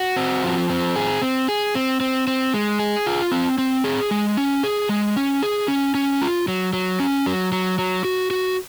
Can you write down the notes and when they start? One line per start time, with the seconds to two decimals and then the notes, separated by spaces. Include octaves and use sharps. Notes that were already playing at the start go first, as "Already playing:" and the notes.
Already playing: F#4
0.16 C4
0.44 F3
0.70 C4
0.96 G#4
1.22 C4
1.48 G#4
1.75 C4
2.00 C4
2.27 C4
2.54 G#3
2.79 G#4
3.06 F4
3.32 C4
3.58 C4
3.84 G#4
4.11 G#3
4.37 C#4
4.63 G#4
4.89 G#3
5.16 C#4
5.42 G#4
5.68 C#4
5.95 C#4
6.22 F4
6.48 F#3
6.73 F#3
7.00 C#4
7.26 F#3
7.52 F#3
7.79 F#3
8.05 F#4
8.31 F#4